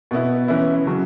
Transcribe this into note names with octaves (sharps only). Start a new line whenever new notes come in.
B2 B3 E4
E3 C#4 E4
C#3 F#3 C#4